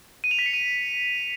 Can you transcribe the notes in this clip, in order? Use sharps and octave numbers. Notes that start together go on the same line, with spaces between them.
D#7
F7
B6
C#7
D#7